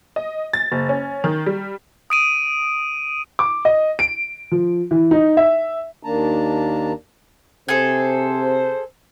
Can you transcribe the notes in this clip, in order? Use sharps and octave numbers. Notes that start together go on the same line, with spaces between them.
D#5
A6
F#1
C#4
D#3
G3
D#6 D7 D#7
D6
D#5
D7
F3
E3
D#4
E5
D#2 D#3 A#3 D4 A5 A#5
C3 G#4 A4 C5